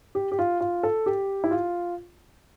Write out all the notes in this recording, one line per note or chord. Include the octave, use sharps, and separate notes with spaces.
G4
G4
F4
F4
A4
G4
E4
F4